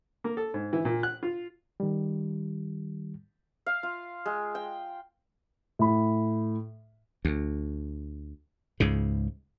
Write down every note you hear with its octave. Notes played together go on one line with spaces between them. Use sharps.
A#3
A4
G#2
E3
A#2
F#6
F4
D#3 G3
F5
F4
G#3
G5
A2 B5
D2
C#2 G#2 C#3